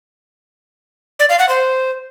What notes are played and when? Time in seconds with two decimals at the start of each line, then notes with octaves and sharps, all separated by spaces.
1.19 D5
1.29 F5
1.39 F#5
1.49 C5